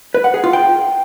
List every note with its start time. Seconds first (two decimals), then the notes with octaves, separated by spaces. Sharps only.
0.14 B4
0.24 F#5
0.34 G#4
0.44 F4
0.53 G5